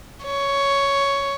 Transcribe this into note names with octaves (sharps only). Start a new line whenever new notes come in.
C#5